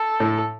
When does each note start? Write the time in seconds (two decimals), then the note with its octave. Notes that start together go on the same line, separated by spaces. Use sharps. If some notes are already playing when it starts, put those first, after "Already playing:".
Already playing: A4
0.20 A2